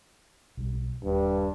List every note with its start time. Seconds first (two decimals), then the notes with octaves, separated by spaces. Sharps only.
0.57 B1 G3
1.04 D#1 G2